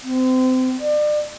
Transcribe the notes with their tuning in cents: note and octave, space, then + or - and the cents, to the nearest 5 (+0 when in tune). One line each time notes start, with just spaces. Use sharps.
C4 -30
D5 +35